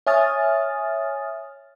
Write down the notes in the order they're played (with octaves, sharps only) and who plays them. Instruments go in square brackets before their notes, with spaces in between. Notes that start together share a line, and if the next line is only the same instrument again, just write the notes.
[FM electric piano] C#5 E5 G#5 D#6 F6 A6